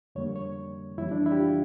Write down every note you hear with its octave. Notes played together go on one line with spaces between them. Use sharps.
F2 D3 G3 A#3 C#5
C#5
F2 E3 G3 E4
D4
E4
G4
F4